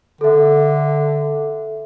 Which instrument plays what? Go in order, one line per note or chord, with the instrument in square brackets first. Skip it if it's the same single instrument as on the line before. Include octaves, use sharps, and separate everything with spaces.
[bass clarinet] D3 [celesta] A4 E5